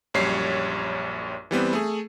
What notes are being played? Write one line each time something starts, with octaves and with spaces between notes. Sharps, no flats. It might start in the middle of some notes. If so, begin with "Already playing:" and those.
A#1 F#2 G3 C#5 B6 C7
E3 G3 B3 C4
A3 G#4